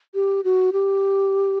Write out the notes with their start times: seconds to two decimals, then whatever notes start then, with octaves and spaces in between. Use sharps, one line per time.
0.15 G4
0.44 F#4
0.73 G4